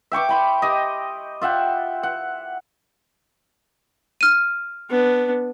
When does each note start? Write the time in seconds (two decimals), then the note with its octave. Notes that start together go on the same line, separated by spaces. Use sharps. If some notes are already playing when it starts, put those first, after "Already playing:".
0.12 E5 G5 C#6 D6
0.29 G5 B5 C6
0.62 G4 D#5
1.41 F4 E5 F#5 G5
2.03 F#5
4.21 F6 D#7
4.90 B3 D4